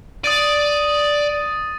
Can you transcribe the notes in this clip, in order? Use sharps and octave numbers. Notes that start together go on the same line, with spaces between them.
D5 D#6 A6 D#7